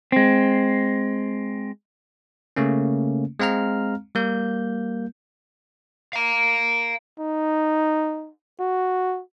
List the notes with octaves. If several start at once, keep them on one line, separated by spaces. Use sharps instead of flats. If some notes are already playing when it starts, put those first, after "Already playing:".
G#3 C4
C#3 A3 A#3 C#4
G#3 C4 F5 A#5 F6
G3 A#3 G6
F5 A#5
D#4
F#4